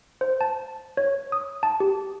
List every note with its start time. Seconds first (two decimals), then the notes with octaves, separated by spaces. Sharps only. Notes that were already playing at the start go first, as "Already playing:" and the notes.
0.21 C5
0.41 A5
0.97 C#5
1.32 D#6
1.63 A5
1.80 G4